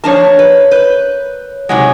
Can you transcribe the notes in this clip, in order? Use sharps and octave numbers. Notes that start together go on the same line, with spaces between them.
F3 D4 A#4 C#5 A5
B4
B4 G6
C3 F#3 G#3 D#4 F#5 G#5